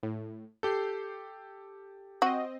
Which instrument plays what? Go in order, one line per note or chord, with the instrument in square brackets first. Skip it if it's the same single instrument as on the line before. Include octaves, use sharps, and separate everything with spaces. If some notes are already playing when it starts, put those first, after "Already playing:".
[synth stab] A2
[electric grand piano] G4 A4 [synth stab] G6 C7
[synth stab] C4 D#5 [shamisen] F#4